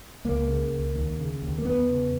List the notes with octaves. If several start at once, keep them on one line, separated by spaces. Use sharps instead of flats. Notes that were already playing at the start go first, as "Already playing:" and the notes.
C#2 A#3
C#3
C#2
D#2
C#3
D#2
A#3
E2 B3
C#3